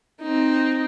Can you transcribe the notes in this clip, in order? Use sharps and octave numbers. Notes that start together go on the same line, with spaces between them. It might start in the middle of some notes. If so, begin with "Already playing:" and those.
C4 D#4